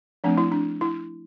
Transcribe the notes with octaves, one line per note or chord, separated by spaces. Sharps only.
F3 A3 C4 D4
E4
D4
E4